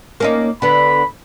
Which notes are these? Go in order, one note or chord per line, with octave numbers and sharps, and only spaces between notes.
A#3 C#4 D#4
D3 B3 B5